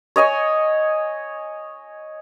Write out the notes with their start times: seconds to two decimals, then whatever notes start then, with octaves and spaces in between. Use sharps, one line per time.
0.16 C#5 D#5 G#5 C#6